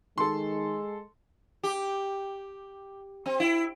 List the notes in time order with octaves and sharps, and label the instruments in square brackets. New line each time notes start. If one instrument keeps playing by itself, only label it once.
[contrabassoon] D#3 [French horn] G#3 [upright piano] A4 C6
[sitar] G4
C4
E4